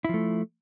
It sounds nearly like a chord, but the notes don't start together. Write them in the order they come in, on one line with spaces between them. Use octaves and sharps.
E4 F3 A3